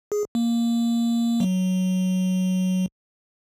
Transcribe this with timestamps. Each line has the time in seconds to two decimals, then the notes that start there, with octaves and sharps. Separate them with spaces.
0.12 G#4
0.35 A#3
1.40 F#3